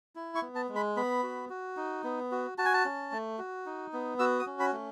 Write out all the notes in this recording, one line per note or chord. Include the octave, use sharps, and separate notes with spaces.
E4
C#6
B3
A5
G#3
B5
B3 B5
F#4
F#4
D#4
B3
F#4
F#4 A5
G#5
A5
C#4
A3
F#4
D#4
B3
F#4 E6
D#6
C#4
B5
A3